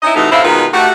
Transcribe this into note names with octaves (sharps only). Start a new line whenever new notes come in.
C#4 D#4 E4 D#5
A2 C3 E3 A3 D#4 F#4
F#2 D3 C4 E4 E5 F5
B2 D#3 G#3 D#4 F4 B4
A3 F#4 G4